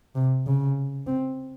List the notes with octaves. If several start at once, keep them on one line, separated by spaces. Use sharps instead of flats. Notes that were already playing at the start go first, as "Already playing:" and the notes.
C3
C#3
C4